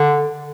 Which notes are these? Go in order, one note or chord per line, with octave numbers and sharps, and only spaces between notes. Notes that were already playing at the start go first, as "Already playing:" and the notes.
Already playing: D3